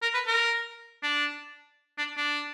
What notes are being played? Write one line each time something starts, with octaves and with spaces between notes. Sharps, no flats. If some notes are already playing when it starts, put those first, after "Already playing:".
A#4
B4
A#4
D4
D4
D4